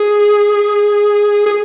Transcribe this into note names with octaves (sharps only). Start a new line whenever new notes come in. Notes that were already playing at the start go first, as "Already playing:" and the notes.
Already playing: G#4
G#4